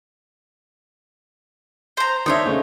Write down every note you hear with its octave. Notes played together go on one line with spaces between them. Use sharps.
C5 A#5
D#3 D4 D#4 C5 C#5 E5
C#3 A3